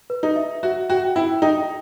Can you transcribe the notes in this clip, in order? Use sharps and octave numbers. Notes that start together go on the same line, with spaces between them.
B4
D#4
E5
F#4 E5
F#4 G5
E4 G5
D#4 G5